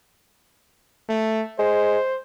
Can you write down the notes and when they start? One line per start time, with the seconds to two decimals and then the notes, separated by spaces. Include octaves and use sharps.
1.09 A3
1.59 G#3 C5